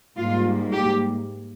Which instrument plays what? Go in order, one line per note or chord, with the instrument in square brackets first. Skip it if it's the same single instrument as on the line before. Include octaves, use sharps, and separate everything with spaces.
[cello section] G#2 G3 A#3 F4
G4